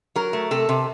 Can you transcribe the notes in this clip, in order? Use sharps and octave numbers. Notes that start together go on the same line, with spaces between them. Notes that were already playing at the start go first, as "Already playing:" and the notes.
F#3 A#4
A3
C3 A4
C3